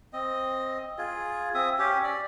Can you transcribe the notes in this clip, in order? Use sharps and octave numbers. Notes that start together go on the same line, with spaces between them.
C4 D#5
F4 G#4
C4 E5 D#6
C#4 G4
D5